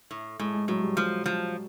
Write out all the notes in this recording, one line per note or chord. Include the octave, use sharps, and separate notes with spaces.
A2
A2 G#3
G#3
A2 F#3
G3
F3 F#3
F3